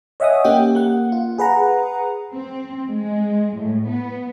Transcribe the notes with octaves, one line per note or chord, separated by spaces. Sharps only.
C#5 D#5 E5 F#5 G#5 D#6
A#3 C#4 G4 G5
A#3 F#5
F4
G#4 B4 F#5 A#5
C4
G#3
A2
B3